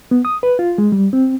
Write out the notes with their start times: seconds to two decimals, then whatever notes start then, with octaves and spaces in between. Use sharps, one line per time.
0.11 B3
0.25 D#6
0.43 B4
0.59 F4
0.78 G#3
0.92 G3
1.13 C4